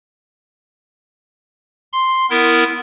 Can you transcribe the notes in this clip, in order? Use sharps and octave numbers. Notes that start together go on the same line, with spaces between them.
C6
B3 E4 A#4